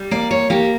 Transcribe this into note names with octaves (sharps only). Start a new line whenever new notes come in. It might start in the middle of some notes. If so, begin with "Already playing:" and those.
Already playing: G3
A#3 D5
C#5
A#3 G4